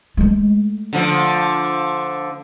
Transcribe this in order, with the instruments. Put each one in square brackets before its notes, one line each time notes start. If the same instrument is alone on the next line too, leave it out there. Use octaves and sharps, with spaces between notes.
[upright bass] G#3 A3
[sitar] D3 F3